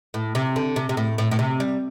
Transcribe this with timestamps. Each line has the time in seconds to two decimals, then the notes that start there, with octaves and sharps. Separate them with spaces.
0.14 A2
0.35 C3
0.56 D3
0.76 C3
0.89 C3
0.97 A2
1.18 A2
1.31 A2
1.39 C3
1.60 G3